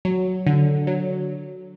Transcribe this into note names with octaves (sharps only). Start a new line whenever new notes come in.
F#3
D3
F#3